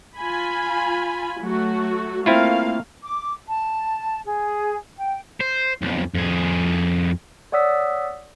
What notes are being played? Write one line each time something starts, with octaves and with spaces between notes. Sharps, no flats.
F4 G#5 B5
F#3 A3 F#4
A3 A#3 C4 E4 F4 F5
D6
A5
G#4
G5
C5
B1 F2
F2 G#4
C#5 D5 F#5 D#6 E6 B6